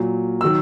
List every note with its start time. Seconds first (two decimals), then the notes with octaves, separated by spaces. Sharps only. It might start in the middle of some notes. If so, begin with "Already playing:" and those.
Already playing: A#2 F#3
0.41 D#3 F#3 E6